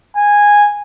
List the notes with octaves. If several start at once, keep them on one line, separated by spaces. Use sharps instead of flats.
G#5